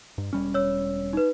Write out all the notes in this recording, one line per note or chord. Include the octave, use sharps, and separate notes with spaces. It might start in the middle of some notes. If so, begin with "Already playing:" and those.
G2
E1 G3 C#4
C#5 E6
D#4 B4